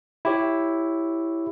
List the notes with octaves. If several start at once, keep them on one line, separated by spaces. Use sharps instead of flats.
E4 G4 C#5